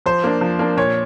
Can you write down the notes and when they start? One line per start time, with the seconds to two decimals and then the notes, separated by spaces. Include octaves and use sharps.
0.06 F3 C5
0.24 A#3 D4
0.41 F3
0.59 A#3 D4
0.77 A#2 C#5